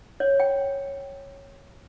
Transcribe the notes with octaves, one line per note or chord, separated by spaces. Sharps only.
C#5
G5